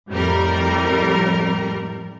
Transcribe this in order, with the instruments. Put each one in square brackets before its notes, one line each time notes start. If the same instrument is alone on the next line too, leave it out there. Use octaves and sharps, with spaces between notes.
[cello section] F2 A2 [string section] G3 A#4